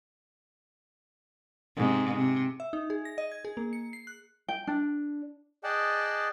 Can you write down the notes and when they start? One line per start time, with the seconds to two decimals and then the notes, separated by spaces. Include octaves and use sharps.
1.77 G#2 C3
2.15 C3
2.60 E5
2.73 D#4
2.90 G#4
3.05 A#6
3.18 D#5
3.32 G#6
3.45 G#4
3.57 A#3
3.73 C#7
3.93 C7
4.07 F#6
4.48 G5
4.67 D4
5.64 G#4 D5 D#5 F#5 G5 A5